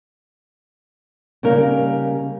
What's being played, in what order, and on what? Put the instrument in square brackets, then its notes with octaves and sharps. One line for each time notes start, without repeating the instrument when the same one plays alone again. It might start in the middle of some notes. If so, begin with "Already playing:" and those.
[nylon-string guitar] C#3 G3 A#3 D#4 A#4